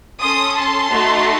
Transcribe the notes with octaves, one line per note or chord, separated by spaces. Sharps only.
C#4 A4 C6 D#6
A5 C6
A3 D#4 F#4